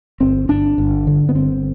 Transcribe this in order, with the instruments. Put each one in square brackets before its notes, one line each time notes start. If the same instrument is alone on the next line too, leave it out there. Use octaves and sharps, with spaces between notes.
[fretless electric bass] G1 C4
G1 D4
G1
D3
B3
G1 C4